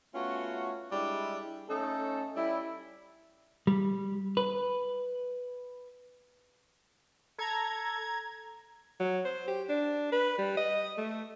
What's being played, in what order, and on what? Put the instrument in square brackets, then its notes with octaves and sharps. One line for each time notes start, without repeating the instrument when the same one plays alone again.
[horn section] A3 B3 C#4 F4 F#4
G3 G#3 D4 E4
A3 C#4 D#4 A4
G3 C#4 E4
[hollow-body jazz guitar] G3
B4
[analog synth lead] A4 [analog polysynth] A#5 G#6
[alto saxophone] F#3
C5
G4
D4
B4
G3
D#5
A3